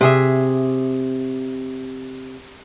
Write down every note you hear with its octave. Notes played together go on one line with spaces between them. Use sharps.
C3 G#4 E5